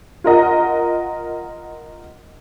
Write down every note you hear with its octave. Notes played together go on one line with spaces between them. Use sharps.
F4 A#4 D#5 F#5